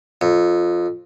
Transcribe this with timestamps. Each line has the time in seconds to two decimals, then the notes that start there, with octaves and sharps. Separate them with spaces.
0.21 F2